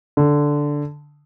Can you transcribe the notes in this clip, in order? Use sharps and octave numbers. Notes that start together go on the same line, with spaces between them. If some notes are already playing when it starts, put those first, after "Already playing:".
D3